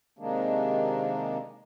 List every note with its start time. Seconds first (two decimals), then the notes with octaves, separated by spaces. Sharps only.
0.19 C3 D#3 G#3 A#3 D4